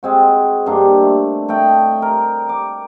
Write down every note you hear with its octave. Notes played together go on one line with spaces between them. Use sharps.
G#3 C4 F#4
G2 A#3 D4 C6
A3
A3 D#5 G5
A#4
D6